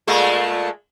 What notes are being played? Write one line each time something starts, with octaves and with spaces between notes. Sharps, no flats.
A#2 G#3 A3